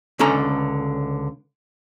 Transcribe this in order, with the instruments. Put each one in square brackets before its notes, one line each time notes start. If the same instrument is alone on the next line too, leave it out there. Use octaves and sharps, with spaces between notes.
[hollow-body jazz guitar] C#2 D3 C#4 A4 A#5